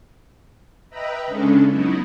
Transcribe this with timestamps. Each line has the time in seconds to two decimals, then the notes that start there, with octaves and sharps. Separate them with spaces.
0.89 B4 D#5 E5 G5 A#5 B5
1.27 C#3 G#3 C#4 D4 A4
1.68 F#3 B3 D#4 E4